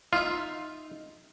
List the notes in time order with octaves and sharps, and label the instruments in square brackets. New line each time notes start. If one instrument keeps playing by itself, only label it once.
[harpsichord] D#4 E5 [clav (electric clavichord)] F4